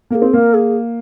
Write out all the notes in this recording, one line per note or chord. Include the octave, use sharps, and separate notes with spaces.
A#3 G#4 A#4
C4
A#3 A#4
G#4